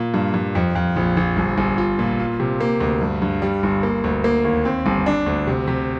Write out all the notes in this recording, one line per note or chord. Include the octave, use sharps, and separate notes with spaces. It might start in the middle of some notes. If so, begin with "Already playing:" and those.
Already playing: A#2
G2
G2
F2
F2
A#1
A#1
G1
G1
F4
A#2
F4
C3
A#3
D2
G2
G2
G3
G1
A#3
D2
A#3
D#2
C4
G1
D4
D2
C3
C3